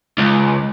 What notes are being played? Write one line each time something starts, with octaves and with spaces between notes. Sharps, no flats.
C#2